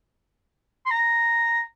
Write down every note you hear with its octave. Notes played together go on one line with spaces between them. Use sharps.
C6
A#5